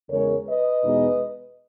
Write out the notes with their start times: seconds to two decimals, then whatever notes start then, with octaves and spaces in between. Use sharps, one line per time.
0.10 E2 C#3 G#3 A#4 C#5
0.47 B4 D#5
0.82 E2 B2 G#3 B3 D#4